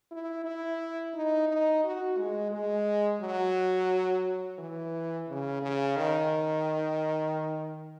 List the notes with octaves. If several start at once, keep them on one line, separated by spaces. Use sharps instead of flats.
E4
E4
D#4
D#4
F#4
G#3
G#3
F#3
E3
C#3
C#3
D#3